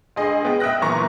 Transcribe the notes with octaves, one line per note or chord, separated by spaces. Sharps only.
C#2 D3 G#4 D#5
G#3 B3 G5
E5 G5 D#6 F#6 A#6
F#1 A#2 E3 B3 A#5 C#6